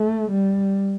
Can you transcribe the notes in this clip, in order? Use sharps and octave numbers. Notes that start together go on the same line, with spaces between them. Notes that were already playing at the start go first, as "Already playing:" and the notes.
Already playing: A3
G3